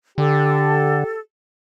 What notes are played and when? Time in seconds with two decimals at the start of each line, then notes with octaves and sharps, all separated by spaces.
0.18 D3 G4 A4